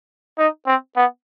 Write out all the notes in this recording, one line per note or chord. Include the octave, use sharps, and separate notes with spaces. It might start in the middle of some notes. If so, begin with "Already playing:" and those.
D#4
C4
B3